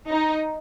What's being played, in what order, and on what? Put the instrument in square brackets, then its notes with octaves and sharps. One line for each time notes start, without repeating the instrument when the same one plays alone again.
[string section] D#4